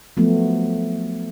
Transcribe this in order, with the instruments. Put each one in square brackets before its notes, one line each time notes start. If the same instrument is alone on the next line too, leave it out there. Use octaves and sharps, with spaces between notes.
[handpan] F3 F#3 A3 B3